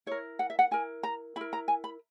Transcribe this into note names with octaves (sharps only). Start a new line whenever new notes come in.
E4 A#4 C#5
F#5
E5
F#5
E4 A#4 G#5
A#5
E4 A#4 B5
A#5
G#5
B5